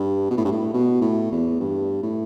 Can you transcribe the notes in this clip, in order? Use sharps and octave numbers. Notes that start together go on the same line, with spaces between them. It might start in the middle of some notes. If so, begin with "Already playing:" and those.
Already playing: G2
B2
A2
G2
A2
B2
A2
E2
G2
A2